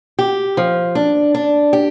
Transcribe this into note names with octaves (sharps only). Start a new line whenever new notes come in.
G4
F3
D4
D4
G4